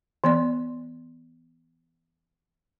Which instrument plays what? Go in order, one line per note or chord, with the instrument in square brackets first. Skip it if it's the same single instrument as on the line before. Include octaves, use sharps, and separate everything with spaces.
[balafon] E3 B3 D5